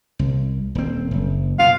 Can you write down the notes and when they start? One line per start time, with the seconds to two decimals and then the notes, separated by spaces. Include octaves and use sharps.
0.19 C2
0.75 D#1 C4
1.11 F#1
1.59 B2 F5